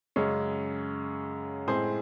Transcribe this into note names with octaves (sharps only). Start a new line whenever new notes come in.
F#2 C#3 G#3 C#4
A2 G#3 C4 G#4 C5